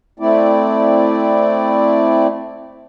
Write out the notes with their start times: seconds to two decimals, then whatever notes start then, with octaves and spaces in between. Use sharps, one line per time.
0.19 A3 C4 E4 D5